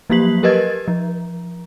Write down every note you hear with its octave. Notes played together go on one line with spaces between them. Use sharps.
F3 F#3 A#3 G4 B6 F#7
G4 A#4 B4 D#5 G#6 A6
F3